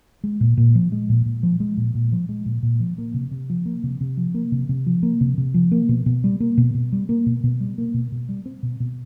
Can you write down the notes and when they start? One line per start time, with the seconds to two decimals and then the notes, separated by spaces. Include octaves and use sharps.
0.24 G#3
0.41 A#2
0.57 A#2
0.75 F3
0.92 G#3
1.10 A#2
1.26 A#2
1.43 F3
1.60 G#3
1.77 A#2
1.95 A#2
2.12 F3
2.29 G#3
2.46 A#2
2.63 A#2
2.80 F3
2.98 A#3
3.14 C3
3.31 C3
3.50 F3
3.66 A#3
3.84 C3
4.01 C3
4.17 F3
4.34 A#3
4.52 C3
4.69 C3
4.86 F3
5.03 A#3
5.21 C3
5.38 C3
5.54 F3
5.72 A#3
5.89 B2
6.06 B2
6.24 G3
6.40 A#3
6.58 B2
6.74 B2
6.92 G3
7.09 A#3
7.26 B2
7.44 B2
7.60 G3
7.78 A#3
7.94 B2
8.12 B2
8.29 G3
8.46 C4
8.63 B2
8.80 B2